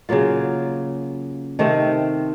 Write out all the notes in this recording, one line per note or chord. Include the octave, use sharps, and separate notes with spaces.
C#3 F#3 A#3 F4
C3 D#3 A3 C4